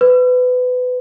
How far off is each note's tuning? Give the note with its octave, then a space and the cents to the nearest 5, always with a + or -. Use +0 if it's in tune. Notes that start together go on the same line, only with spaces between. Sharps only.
B4 +25